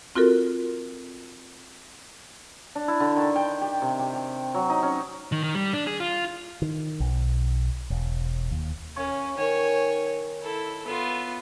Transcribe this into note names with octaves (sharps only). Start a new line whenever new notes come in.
C4 F4 F#4 A4 A#4
D4
E4
D3
D#3
G5
G4
C3
G4
G4
F#3
D#4
C#4
D#3
D#3
G3
D4
G#4
F4
D#3
B1
E1
D#2
C#4 C#5 F5 C#6
D#3 C#5 G#5
E4 A4
B3 F4 E5